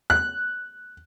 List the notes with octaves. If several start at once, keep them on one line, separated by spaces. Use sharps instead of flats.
F#6